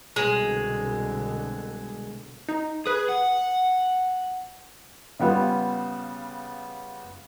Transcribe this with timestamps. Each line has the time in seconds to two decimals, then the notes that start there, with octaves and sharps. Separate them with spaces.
0.16 C2 B2 D3 G#3
2.49 D#4
2.86 G#4 B4 D#6
3.09 F#5
5.19 C#3 G3 B3 F4